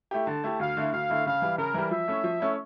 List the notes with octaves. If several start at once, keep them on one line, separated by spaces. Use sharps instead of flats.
A3 E4 G4
D3 A5
A3 E4 G4
D2 F5
D3 A3 E4
D2 F5
D3 A3 E4
C#3 F5
E3 G3
C#3 A#4
E3 G3
F3 E5
A3 C#4 E4
F3
A3 C#4 E4